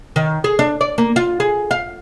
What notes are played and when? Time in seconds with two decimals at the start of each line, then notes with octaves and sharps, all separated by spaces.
0.16 D#3
0.44 G#4
0.59 D4
0.81 D5
0.98 A#3
1.16 F4
1.40 G#4
1.71 F5